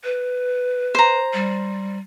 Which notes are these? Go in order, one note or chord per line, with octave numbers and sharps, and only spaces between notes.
B4
C5 A#5
G3